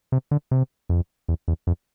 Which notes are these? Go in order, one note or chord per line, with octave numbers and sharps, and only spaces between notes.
C3
D3
C3
F2
E2
E2
F2